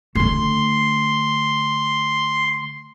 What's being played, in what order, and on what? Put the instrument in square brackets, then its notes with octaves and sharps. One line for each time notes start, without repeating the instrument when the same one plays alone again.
[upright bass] D3 A3 [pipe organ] C6